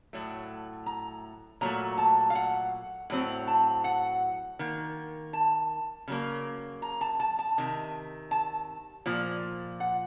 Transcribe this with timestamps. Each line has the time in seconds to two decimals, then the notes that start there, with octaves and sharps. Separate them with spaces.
0.13 A2 F#3 A3
0.86 A#5
1.61 A#2 F#3 A3 A#5
1.98 A5
2.30 F5
2.35 F#5
3.10 A2 F#3 C4
3.47 A5
3.84 F#5
4.59 D#3 A#3
5.33 A5
6.08 C#3 F#3 A#3
6.82 A#5
7.01 A5
7.20 A5
7.39 A5
7.58 C3 D#3
8.31 A5
9.06 A#2 F3
9.80 F#5